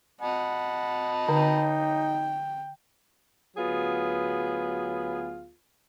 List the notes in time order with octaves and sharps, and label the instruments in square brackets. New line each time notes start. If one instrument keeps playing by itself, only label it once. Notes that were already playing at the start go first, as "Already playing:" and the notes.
[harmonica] D#5 A5 B5 [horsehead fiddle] F#5
[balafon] D3 [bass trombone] D#4 [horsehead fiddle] G5
[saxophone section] D2 F#3 B3 F4 G#4